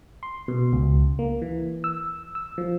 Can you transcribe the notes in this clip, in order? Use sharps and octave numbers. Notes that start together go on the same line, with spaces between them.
C6
B2
C#2
A#3
E3
E6
E6
F3